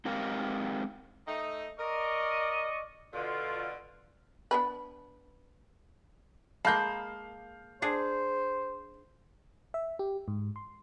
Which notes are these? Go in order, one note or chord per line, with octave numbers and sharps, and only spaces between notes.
G#3 C4 D#4 G4 A#4 F5
A3 D#4
A#4 D5 D#5 C#6
B2 D3 F4
B3 D4 B4
G#3 A#3 F5 A5 B5 D#6 G6
D4 G#4 C5
E5
G4
G#2
C6